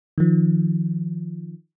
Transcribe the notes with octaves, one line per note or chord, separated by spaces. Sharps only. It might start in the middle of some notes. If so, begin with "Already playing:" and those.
D#3 F3